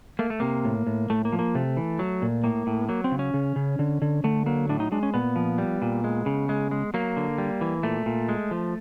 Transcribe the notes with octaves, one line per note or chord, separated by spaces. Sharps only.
A3 A#3
A3
C3 A#3
A2
A2
A2 A3
A#3
F3
A#3
C3 A3
E3
F#3
A#2
A2 A#3
A2
F#3 A#3
C4
C#3
C#4
C#3
C#3
D3
D3
D3 A3
F#3 A#3
A2 D4
D#4
G#3 D4
C#4
A#2 B3
F3
G3
A#2
G#3
C#3
G#3
G#3
F#3 A#3
D3
G3
E3
A#2 A3
A#2
G#3
F3